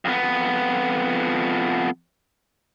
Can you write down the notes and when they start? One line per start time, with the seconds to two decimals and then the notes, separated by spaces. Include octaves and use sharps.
0.05 F2 B3